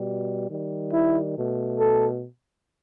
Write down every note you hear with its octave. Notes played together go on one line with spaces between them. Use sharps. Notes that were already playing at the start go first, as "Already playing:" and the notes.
Already playing: B2 G3
D#3 G3
E4
B2 A3
A4